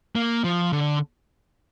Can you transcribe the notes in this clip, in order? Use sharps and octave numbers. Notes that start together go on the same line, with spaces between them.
A#3
F3
D3